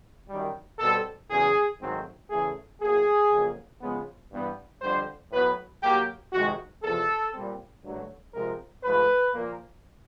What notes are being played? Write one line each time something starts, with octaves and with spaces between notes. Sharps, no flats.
F#2 D#3 G3
B2 G3 C4 A4
E2 C#3 F#3 G#4
G#2 D#3 F#3 A3 C4
E2 C#3 E3 A3 G#4
A2 F#3 A#3 G#4
F2 C#3 F#3 A#3
C#3 F3 G#3 B3
G2 E3 G3 B3
F2 D3 G3 C5
A2 F#3 B3 B4
A2 F#3 A#3 G4
F2 C3 D#3 G#3 F#4
E2 C3 F3 A4
A#2 G3 C4
G2 D3 F#3 A3
C3 F3 G#3 C4 A#4
G#2 F3 A3 B4
A#2 F3 A#3